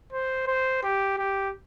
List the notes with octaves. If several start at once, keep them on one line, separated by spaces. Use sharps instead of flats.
C5
C5
G4
G4